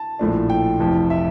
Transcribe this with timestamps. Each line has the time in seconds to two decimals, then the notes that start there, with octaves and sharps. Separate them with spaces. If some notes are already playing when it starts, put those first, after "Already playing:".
Already playing: A5
0.19 A#1 A2 F3 A3 D4
0.50 G5
0.79 F1 F2 E3
1.10 E5